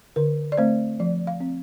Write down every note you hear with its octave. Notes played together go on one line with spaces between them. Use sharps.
D3 A#4
D5
A3 C4 C5
F3 D5
F5
C4